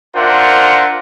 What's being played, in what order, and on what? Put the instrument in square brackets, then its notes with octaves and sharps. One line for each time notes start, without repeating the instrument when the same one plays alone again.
[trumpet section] D4 F4 A#4 C5 E5 F#5